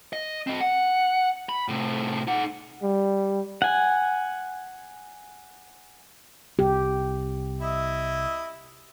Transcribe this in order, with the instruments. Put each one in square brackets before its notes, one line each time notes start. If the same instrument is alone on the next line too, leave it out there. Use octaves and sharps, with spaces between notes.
[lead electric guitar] D#5
C4 D#5
F#5
B5
A2 C3
D#4 F#5
[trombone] G3
[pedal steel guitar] F#5 G#5
[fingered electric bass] C2 [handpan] G4
[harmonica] E4 D#5 E5